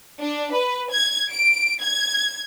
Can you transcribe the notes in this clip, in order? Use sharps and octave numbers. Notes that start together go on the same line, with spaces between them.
D4
B4
G#6
D7
G#6